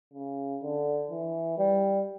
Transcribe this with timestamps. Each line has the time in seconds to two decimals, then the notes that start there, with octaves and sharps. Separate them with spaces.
0.14 C#3
0.62 D3
1.11 E3
1.58 G3